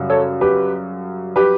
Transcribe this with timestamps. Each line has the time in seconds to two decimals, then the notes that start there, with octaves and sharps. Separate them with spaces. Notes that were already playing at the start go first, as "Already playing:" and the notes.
Already playing: F#2 C#3 G3
0.10 A4 C#5
0.41 G4 B4
1.36 G4 B4